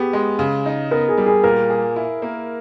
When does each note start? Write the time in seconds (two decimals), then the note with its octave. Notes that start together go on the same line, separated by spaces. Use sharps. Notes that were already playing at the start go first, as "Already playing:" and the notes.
Already playing: B3 G4 G#4
0.13 G#3
0.39 C#3
0.66 D#4
0.91 B3 A#4
1.09 G#4
1.18 G3
1.26 G#4
1.44 A#2 A#4
1.70 G#4
1.96 E4
2.22 A#3